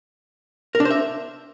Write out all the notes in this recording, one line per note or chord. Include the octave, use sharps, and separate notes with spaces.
A#4
D4
C5
E5